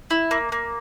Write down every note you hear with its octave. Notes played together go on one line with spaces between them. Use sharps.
E4
A#3
A#3